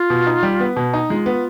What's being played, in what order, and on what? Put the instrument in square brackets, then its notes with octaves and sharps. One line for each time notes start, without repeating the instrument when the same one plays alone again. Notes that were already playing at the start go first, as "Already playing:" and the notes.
Already playing: [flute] F4
[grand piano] B2
D#4
G3
B3
B2
D#4
[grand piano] G#3 [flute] F4
[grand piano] B3